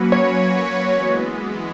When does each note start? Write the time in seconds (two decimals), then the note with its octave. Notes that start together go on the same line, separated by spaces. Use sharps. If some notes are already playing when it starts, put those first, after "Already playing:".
Already playing: F#3 A#3 C#4 F#4 B4
0.12 C#5
0.94 E3 G#3 B3